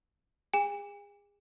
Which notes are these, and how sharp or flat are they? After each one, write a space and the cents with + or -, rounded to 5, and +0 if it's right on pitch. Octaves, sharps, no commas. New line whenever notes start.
G#4 -30 G#5 -45